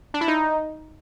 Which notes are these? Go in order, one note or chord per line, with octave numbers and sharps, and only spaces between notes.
D4
E4
D#4